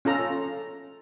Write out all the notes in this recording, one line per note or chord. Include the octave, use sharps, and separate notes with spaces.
C#4 F4 A4 A#5